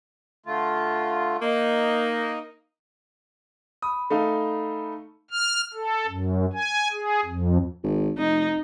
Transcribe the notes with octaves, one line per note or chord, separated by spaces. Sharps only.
D3 A3 F4
A#3 D#4 D#5
B5 D#6
A3 D#4 F5
F6
A4
F#2
G#5
G#4
F2
G#1
F1 D#4